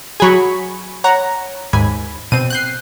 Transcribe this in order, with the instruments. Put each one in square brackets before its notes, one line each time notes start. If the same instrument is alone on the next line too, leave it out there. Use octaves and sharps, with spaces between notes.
[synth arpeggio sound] F#3 G#4 [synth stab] G#5 B5 C#6
[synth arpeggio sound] C#5 F#5 A#5
[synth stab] D#2 G#2 B5 [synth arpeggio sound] G#5
[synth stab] B2 C4 [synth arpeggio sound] D#7
[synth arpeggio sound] F#6 G6 C7